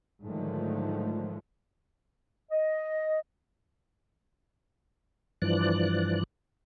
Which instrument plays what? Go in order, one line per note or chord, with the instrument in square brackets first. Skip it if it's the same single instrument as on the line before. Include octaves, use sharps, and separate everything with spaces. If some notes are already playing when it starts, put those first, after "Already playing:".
[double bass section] G#2 D3 D#3 F3 F#3 A3
[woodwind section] D#5
[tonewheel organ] G2 E3 F3 D5 F#6